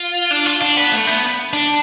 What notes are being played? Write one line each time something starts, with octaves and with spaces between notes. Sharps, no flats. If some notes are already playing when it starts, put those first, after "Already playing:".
Already playing: F4
D4
F4
D4
B3
A3
B3
D4